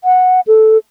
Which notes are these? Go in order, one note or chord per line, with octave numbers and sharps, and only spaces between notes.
F#5
A4